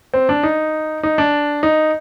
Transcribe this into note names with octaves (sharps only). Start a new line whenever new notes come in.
C4
D4
D#4
D#4
D4
D#4